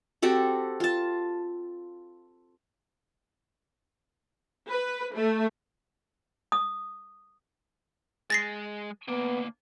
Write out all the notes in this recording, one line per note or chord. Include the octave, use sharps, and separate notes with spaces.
C4 F#4 G4 A4
F4 A5
B4
A3
D#6
G#3 G#4 A6 A#6 C7
D2 A#3 B3